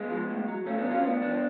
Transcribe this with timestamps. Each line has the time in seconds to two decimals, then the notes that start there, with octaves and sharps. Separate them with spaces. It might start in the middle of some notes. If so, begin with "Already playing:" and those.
Already playing: G#3 B3
0.10 F3
0.30 A2
0.48 F#3
0.66 C#3 A3 C#4
0.78 B3 D4
0.84 F#3
0.91 C#4 F4
1.03 A2 B3 D4
1.21 F3 B3 D4